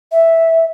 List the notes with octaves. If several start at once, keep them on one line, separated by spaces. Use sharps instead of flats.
E5